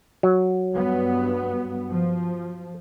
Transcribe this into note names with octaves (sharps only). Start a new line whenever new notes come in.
F#3
G2 B3
F3